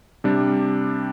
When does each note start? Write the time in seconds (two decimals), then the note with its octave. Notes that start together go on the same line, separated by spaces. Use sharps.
0.24 C3 G3 D4